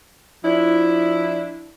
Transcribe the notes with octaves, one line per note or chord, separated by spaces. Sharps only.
F3 D4 E4